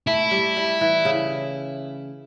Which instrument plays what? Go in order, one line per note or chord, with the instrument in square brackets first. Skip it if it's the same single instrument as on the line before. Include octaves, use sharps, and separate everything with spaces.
[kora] A3 [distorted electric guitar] E4
[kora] G3
G3
E3
C#3